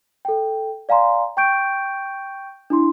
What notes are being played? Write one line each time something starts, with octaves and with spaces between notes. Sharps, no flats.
A4 G5
D5 F5 G#5 A#5 C6
G5 C#6 G6 D7
D4 E4 C6